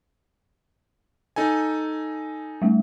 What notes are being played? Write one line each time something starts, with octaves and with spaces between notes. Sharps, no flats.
D#4 A4 G#5
G3 A3